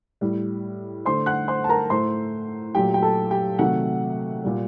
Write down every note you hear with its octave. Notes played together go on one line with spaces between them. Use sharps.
A2 G3
D3 A3 C5 C6
F#5 F#6
C5 C6
A5
A#4 A#5
A2 A3 C5 C6
A#2 F#3 A3 G4 G5
G5
A4 A5
G4 G5
C3 D#3 F#3 A3 F#4 F#5
A#2 G3